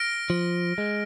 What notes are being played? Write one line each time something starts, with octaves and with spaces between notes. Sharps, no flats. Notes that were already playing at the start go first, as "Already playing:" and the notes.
Already playing: F6 A#6 D7
F3
G#3